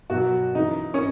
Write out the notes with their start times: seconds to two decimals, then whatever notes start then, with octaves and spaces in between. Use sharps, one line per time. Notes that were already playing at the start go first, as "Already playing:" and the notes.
0.10 B2 F#3 F#4
0.55 C#3 E3 D#4
0.94 C#4